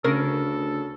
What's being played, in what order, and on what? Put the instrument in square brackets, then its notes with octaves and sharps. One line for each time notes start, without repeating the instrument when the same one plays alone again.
[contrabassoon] D2 [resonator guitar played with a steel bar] C#3 [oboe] A4 [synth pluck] A#4